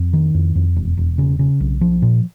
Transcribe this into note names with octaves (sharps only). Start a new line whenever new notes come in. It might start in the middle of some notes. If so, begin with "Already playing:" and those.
Already playing: F2
D#3
F2
F2
E1
E1
C#3
C#3
B1
F3
A#2